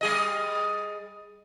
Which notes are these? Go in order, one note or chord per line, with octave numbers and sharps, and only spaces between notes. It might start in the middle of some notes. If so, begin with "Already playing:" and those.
G3 G#4 D#5